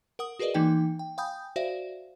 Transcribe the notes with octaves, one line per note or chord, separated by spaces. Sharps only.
A#4 F#5 D#6
F#4 G#4 A#4 B4 D5 D#5
E3 A#3 D#4 G5
G5
F5 G5 G#5 B5 D#6 G6
F#4 C5 D5 E5 F5